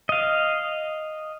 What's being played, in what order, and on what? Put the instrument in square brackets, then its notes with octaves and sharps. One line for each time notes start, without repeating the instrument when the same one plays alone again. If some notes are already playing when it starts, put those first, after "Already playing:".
[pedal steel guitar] D#5 F5